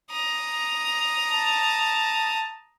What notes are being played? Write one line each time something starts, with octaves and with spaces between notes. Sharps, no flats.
A#5 D#6
A5